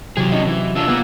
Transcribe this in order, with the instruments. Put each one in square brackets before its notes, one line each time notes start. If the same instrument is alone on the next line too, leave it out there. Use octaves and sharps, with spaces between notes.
[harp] C3 [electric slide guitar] E3 G#4 [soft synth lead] F#3
[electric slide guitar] C#4 D#4
E3
[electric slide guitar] F#3 D4 F4 [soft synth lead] E6
[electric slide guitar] A#3 F4 [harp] B3 G#4